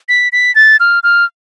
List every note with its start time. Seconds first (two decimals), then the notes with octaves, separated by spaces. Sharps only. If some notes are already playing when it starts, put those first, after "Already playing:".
0.09 B6
0.32 B6
0.55 A6
0.80 F6
1.03 F6